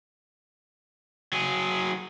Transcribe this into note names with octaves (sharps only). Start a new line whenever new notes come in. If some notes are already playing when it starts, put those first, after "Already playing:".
F#3 G#4